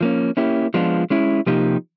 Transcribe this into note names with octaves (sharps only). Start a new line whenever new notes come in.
F3 A#3 C#4
A#3 C#4 E4 G4
F3 G#3 B3 D4 F4
G#3 C#4 E4
C3 F3 A#3 D#4 G4